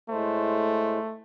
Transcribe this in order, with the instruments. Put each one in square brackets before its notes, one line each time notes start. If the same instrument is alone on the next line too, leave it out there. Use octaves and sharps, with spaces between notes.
[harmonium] A2 G#3 C5 [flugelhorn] A3